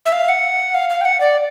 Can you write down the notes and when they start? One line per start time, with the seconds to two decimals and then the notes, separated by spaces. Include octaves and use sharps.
0.06 E5
0.12 F5
0.29 F#5
0.74 F5
0.90 F5
1.01 G5
1.05 F#5
1.20 D5